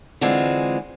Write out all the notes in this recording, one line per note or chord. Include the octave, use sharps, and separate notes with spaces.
D3 E3 G#3 C4 F4